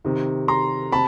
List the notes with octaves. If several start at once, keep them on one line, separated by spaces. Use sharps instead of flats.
C3 D#3
A#5 C6
C3 A5 B5